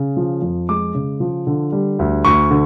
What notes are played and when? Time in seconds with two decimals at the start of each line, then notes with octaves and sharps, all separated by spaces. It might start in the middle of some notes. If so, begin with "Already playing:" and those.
Already playing: C#3
0.17 F3
0.42 F2
0.69 G#3 D6
0.95 C#3
1.20 F3
1.47 D3
1.72 G3
1.99 D2
2.25 D2 C#6
2.51 D3